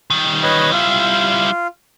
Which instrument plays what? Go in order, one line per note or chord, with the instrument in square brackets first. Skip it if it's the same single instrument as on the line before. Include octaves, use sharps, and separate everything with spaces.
[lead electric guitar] D#3 G3
[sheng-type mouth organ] B4 C#5 D#5
[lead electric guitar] G3 E4 [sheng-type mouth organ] F4